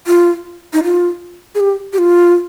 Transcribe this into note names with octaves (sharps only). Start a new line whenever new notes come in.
F4
D#4
F4
G#4
G4
G4
F4